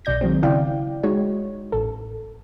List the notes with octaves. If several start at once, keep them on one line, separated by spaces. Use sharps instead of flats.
B1 B2 D5 G6 A#6
D#3 F#3 G#3 C4
C#3 E4 D5 F5 G5
G#3 D#4 F#4 C#5
A1 A4